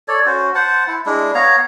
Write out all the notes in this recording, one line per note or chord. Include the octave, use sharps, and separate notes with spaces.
A4 C#5 D5
C#4 F#4 C5
C5 F#5 A5
E4
G#3 D4 E4
B3 C#5 F5 A#5